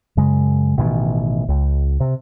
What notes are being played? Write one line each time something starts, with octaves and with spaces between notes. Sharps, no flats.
F#2 C#3 G#3
A1 B2 D#3
C#2
C3